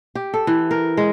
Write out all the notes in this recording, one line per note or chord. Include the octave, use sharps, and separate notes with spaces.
G4
A4
E3
A#4
G#3